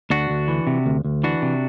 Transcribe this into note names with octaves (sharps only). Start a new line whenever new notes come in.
D2 D4 F#4
D2
E3
C3
D2
D2
E3 D4 F#4
C3